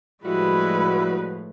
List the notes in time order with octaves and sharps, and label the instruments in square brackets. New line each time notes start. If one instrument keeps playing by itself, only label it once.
[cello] A2 F3 [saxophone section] G3 F#4 [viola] G#3 B4 [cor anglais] E4